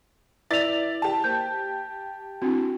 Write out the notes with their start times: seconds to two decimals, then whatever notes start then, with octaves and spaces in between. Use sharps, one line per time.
0.51 E4 B4 D5 E5 A6 F7
1.02 G4 A5
1.24 A#3 A#4 C5 G6
2.42 C4 D4 E4 F#4